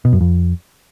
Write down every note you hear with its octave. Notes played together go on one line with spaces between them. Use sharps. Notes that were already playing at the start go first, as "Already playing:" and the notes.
B2
F#2
F2